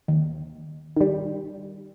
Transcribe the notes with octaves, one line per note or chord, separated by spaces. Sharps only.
D#2
D#3 G3